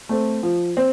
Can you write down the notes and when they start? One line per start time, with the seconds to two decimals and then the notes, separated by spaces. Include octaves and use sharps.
0.09 A3 C4
0.43 F3
0.77 C4